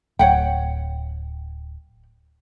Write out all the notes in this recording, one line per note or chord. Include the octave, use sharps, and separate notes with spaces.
D1 C#5 F#5 G5